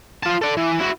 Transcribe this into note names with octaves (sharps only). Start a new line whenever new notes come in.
F4 A5
A4 D5
E3
E4 F#4